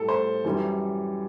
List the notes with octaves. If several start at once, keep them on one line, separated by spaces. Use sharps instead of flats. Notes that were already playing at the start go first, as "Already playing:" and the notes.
Already playing: A2 G3 A4
C5
F#2 E3 G3